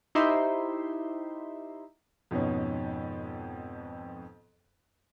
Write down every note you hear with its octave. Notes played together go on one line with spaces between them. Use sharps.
D#4 E4 G4 C5 E5 C6
F2 G#2 B2 B3 C#4